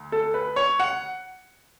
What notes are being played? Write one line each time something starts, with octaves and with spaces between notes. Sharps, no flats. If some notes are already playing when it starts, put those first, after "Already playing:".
Already playing: D2
A4
B4
C#5
F#5